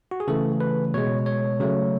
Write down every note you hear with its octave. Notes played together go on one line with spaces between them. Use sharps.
F#4
G#4
C#3 E3 A3 A4
B4
B2 G#3 C#5
C#5
C#3 F#3 A3